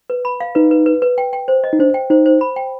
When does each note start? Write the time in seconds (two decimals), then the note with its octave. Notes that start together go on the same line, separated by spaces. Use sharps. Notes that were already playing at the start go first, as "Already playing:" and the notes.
0.10 B4
0.25 B5
0.40 F5
0.55 D#4 B4
0.71 B4
0.86 B4
1.02 B4
1.18 G5
1.33 G5
1.48 C5
1.64 D#5
1.73 D#4
1.79 D4 C5
1.94 G5
2.10 D#4 C5
2.26 C5
2.41 B5
2.56 G5